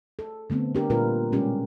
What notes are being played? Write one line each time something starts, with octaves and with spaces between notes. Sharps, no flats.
A4
D3 A3 B3 C4
D4 G4 A#4
A#2 G3 A3 F4 A#4 B4
B2 G3 G#3 C#4 G4